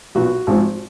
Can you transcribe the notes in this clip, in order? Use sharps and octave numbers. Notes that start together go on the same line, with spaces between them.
B1 A#2 F#3 F#4
G#1 G#2 F3